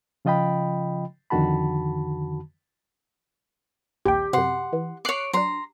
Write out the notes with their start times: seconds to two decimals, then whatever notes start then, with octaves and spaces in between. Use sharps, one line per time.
0.25 C#3 F3 F4 D#5 G5 B5
1.30 F2 D3 D#3 F#4 A5 B5
4.06 A#1 D#2 G4 G5
4.33 F#2 C3 F#5 C6
4.73 E3
5.05 C#5 D6 F#6 C7 C#7
5.33 F#3 D4 A#5 C6